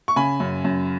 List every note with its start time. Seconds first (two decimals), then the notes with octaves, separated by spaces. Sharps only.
0.08 C#6
0.16 C#3 G#5 B5
0.40 F#2
0.64 F#2